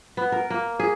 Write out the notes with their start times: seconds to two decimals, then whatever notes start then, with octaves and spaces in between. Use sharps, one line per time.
0.17 B3
0.32 A#4
0.50 A#3
0.80 G#4